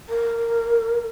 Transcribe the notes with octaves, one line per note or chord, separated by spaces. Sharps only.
A#4